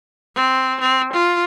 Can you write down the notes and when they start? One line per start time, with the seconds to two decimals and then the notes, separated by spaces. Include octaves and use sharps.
0.35 C4
0.81 C4
1.13 F4